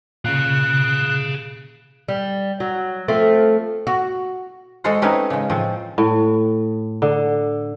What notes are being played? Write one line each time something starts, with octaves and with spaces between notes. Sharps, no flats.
A#2 C#3 G#4 F5 F#6
G3
F#3
F3 A3 C4
F#4
G#3 F#4 A4 C5 F#5
A3 C4 C#4 D#4 B4
C#3 G#3
A2 F3 C4
A2
D3